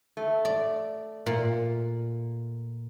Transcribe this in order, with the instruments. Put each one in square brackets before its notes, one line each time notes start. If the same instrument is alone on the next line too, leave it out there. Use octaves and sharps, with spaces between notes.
[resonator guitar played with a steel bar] A3
[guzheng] D5
A#2